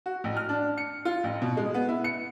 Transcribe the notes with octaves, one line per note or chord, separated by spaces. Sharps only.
F#4
A1
F6
D4
C#7
F4
A1
B2
G#3
B3
E4
C#7